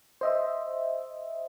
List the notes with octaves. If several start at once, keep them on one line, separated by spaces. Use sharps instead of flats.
C5 D#5 E5